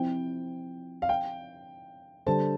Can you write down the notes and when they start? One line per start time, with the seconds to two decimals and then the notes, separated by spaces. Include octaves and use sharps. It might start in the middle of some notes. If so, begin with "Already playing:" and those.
Already playing: F3 C4 E4 G5
1.02 F5
1.09 G5
2.27 D3 G3 D4 A4 C5 A5